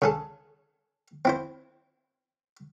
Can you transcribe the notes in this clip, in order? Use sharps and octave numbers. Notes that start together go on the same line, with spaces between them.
C#3 G#4 A4
C4 E4 C5